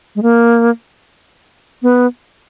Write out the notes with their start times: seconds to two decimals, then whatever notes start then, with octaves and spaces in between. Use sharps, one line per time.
0.16 G#3
0.23 A#3
1.82 B3